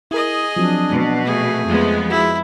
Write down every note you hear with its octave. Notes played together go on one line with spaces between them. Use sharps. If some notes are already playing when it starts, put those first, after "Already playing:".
E4 G#4 A#4 D#5
F3 F#3 C4 D4
B2
A3 G#4
F2 G#3 B3
E4 F#4 G#4